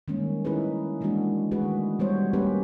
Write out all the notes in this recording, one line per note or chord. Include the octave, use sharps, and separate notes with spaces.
D#3 G3 G#3 A#3 C#4
C#4 D#4 E4 G#4 B4
E3 G#3 A#3 D4 F#4
D#3 G#3 A3 F#4 G#4 B4
G3 B3 F#4 C5 C#5
A#3 C#4 G4 B4